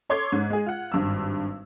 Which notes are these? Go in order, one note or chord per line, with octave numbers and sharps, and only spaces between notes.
A4 C#5 C6 D6 G#6
G#2
G#3 G#4
F4 F#5
G#1 G2 E6